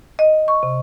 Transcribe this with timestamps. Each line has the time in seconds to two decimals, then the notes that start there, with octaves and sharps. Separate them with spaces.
0.19 D#5
0.48 C#6
0.63 C3